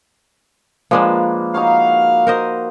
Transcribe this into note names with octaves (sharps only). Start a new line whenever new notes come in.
F3 G#3 A#3 D4 B4
D#4 F#4 C#5 F5
A#4 C5 D#5